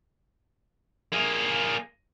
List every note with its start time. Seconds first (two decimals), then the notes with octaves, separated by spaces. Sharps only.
1.13 A#3 G#4